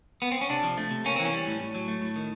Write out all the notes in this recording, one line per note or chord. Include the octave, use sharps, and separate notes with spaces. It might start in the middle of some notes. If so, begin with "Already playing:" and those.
B3
C4
C#4
C3 D4
F3
A3
C3
A#3 C#4
E3 C4
C#4
G3
A2
A2
F#3
A3
A2
D#3